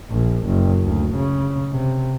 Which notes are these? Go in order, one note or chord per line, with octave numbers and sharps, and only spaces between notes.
A#1
F#1
D2
C#3
C3